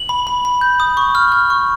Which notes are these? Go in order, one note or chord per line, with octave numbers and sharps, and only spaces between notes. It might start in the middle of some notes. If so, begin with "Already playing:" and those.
Already playing: F#7
B5
B5
B5
G6
D#6
C#6
F6
F6
C#6